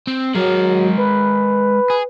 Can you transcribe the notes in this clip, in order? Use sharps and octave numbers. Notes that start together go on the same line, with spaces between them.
C4
F#3 G#3 A#4
B4
G#4